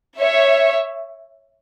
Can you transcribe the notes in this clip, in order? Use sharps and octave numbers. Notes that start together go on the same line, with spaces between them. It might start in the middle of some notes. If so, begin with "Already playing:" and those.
C#5 E5